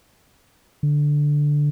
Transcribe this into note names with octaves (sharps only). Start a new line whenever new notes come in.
D3